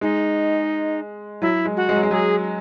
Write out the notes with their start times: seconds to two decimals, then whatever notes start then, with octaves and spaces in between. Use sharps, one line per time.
0.01 G#3 D#4
1.42 F#3 E4
1.65 G#3
1.77 F#4
1.89 G#3
1.96 F#3
2.03 G#3
2.11 F#3 G#4